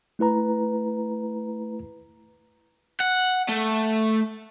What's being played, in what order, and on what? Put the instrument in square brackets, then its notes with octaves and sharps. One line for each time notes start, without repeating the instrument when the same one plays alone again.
[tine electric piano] A3 E4 B4 A#5
[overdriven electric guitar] F#5
A3